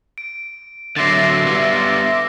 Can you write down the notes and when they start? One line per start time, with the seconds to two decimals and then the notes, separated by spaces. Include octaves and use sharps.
0.18 D7
0.96 D3 F#3 E5 C6 D6 A6 A#6 C7
1.46 G3 B3